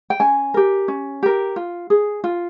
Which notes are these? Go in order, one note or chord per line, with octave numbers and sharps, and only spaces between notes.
G5
C#4 G#5
G4 A#4
C#4
G4 A#4
F4
G#4
F4